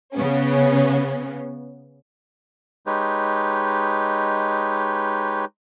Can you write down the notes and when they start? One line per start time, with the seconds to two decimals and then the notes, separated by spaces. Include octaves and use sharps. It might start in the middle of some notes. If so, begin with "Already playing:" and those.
0.14 C#3 B3 C#4
2.87 G#3 D#4 G4 B4 C#5